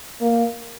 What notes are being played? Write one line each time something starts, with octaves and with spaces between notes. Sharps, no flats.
A#3